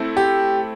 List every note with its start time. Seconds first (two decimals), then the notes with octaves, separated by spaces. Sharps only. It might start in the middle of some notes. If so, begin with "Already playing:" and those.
Already playing: A3 C4 E4 A4
0.17 G4